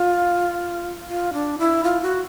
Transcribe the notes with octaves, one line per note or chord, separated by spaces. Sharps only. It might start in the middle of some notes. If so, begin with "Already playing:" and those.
Already playing: F4
F4
D4
E4
F4
F#4